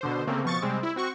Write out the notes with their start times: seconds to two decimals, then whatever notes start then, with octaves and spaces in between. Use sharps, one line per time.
0.01 B2 D3 C5
0.27 C#3 A3 A#3 C4
0.44 B2 F3 C#6 A6
0.62 C3 G3 G#3 C4
0.83 E4
0.96 C4 F#4 C#6